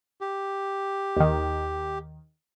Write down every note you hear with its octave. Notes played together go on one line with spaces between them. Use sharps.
G4
D#2 D#3